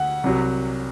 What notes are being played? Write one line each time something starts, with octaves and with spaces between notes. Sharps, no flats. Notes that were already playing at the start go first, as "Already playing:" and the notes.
Already playing: D2 F#5
C2 C3 F#3